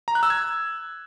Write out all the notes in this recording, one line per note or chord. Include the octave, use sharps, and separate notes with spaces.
A#5
F#6
E6
G#6